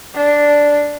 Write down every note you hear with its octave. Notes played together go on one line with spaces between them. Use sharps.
D4